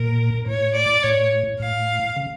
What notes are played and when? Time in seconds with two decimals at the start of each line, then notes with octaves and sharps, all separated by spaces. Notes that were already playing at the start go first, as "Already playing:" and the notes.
Already playing: A#2 A#4
0.46 A2 C#5
0.75 D5
1.03 A2 C#5
1.60 A2 F5
2.16 C#3